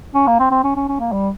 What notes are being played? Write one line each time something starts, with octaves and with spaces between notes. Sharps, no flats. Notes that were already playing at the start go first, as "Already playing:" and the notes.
C#4
A#3
C4
C4
C#4
C#4
C#4
A#3
G3